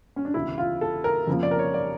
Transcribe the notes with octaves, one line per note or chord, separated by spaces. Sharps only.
C#4
D4
E1 D2 C#3 E4
F4
A4
A#4
F2 C#3 F3 A#3
D5
A#4
C#5
D5